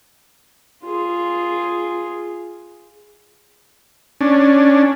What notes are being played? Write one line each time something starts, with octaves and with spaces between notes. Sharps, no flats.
F4 G#4
C#4 D4